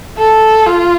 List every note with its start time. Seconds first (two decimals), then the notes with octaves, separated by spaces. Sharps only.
0.18 A4
0.67 F4